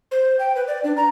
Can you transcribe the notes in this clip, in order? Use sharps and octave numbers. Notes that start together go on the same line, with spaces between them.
C5
G5
B4
D5
D4
A#5